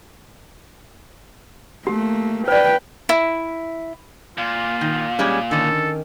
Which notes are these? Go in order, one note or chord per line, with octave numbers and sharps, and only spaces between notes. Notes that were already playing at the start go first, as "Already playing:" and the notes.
A3 A#3 G4
B4 C5 D5 G5
E4
A#2 F4
D#3
G3 G#3 C#4
D3 D#3 C#4 A4